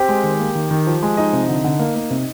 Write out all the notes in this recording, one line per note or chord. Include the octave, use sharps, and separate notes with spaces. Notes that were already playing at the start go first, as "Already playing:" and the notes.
Already playing: C4 G4 G5
G#3
D#3
A#3
D#3
D#3
F3
G#3
F3 D#4 D#5
C3
D3
D3
A#3
A#3
C3